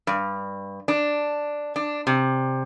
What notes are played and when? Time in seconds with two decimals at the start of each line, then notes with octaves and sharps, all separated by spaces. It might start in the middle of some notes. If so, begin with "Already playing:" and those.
0.07 G2
0.88 D4
1.76 D4
2.07 C3